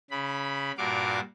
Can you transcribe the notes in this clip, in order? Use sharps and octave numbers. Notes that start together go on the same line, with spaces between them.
C#3 B5
G2 A#2 F#4 A#4 F5 D6